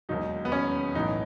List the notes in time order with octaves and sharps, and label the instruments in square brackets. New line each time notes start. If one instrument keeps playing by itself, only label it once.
[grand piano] E1 D#2 D#3 F#3 [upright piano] D#4
[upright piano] B3
C#4
[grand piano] B1 A2 E3 [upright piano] D#4